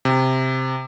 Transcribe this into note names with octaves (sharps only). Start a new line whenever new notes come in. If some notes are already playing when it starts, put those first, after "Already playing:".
C3